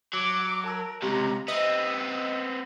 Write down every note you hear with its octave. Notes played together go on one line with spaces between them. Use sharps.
F#3 D6
A#4 A5 E6
C#2 C3 G4 A#5
B3 C4 D#5 E5 E6